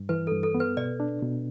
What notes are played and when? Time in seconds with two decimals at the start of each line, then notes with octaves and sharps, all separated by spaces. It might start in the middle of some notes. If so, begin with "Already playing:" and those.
Already playing: G2
0.09 E3 B4
0.27 A4
0.32 G2
0.43 A4
0.54 B3
0.60 B4
0.77 B2 D5
1.00 D4
1.22 B2